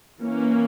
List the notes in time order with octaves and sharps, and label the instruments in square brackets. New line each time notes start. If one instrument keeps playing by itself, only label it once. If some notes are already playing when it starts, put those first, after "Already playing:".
[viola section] E3 A#3 C#4